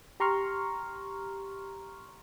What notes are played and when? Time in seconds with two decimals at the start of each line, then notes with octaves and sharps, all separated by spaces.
0.20 G4 A#5 C6 C#6 F6